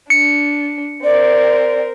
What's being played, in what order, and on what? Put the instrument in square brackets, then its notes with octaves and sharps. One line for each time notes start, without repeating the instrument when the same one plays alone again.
[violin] D4 [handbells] C#7
[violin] C4 A#4 [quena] D5